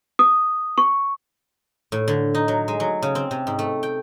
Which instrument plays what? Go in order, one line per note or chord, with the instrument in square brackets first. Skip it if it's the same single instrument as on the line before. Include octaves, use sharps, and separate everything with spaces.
[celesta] D#6
C#6
[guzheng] A2
D3
D#4
F#3
G#3
F#3
C#3
C4
C3
G#2
A3
G5